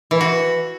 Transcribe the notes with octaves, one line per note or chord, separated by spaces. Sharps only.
E3
F#4